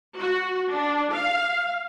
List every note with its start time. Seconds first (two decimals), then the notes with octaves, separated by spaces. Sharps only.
0.17 F#4
0.72 D4
1.12 F5